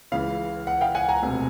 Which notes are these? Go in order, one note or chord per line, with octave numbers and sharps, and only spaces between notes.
C#2 C#3 E3 F5
F#5
F5 G5
F#5 G#5
G#5 A#5
E1 D2 C3